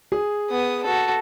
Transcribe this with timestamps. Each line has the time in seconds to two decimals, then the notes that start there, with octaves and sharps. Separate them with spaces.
0.12 G#4
0.50 B3 D#6
0.84 F#4 A4